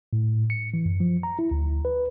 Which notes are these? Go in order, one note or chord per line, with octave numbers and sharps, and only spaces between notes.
A2
C#7
E3
F#2
F3
A#5
E4
D2
B4